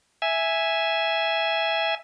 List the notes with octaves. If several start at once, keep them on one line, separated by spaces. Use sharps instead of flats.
E5 G#5